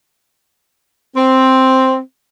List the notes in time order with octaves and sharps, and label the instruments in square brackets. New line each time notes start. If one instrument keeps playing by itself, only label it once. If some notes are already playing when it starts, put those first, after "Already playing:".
[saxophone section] C4